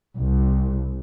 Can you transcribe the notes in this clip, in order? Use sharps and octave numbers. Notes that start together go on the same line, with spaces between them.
C2